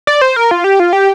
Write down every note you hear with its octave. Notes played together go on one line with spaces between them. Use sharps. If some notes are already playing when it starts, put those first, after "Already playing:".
D5
C5
A#4
F4
G4
F4
G4